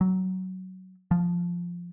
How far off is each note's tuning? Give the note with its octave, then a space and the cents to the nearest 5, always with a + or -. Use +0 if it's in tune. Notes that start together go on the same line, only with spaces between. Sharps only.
F#3 +15
F3 +0